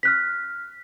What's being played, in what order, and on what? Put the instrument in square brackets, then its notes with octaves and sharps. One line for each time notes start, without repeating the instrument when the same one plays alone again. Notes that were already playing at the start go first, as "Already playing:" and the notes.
[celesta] F6 F#6 B6